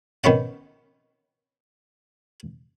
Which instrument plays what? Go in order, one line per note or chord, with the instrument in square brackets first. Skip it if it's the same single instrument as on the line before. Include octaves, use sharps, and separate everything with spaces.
[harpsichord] D#3 B3 C#4 F#5